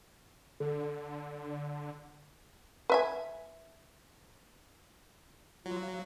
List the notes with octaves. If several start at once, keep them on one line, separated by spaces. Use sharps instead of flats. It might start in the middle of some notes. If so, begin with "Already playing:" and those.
D3 A4
B4 E5 G#5
F#3 F4
F5